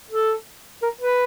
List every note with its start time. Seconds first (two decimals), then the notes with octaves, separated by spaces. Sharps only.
0.11 A4
0.83 A#4
1.01 B4